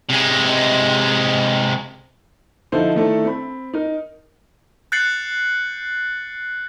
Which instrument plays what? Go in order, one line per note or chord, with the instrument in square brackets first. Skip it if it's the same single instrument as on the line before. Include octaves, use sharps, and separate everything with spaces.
[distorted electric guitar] C3 G#3
[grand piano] D3 F3 D#4 E4 A4 C5
D#3 A3 D4 E4 A4
C4 B5
D#4 A#4
[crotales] F#6 G6 A6 C7 C#7 F#7